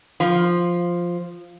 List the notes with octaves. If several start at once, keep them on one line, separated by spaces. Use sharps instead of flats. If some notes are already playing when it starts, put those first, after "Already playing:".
F3